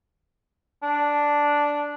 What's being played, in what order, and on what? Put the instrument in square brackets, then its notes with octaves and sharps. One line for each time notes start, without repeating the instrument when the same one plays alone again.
[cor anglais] D4